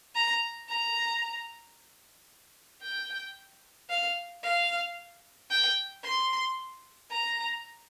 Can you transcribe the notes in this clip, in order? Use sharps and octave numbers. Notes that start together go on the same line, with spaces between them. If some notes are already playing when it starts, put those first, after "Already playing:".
A#5
A#5
G5
F5
F5
G5
C6
A#5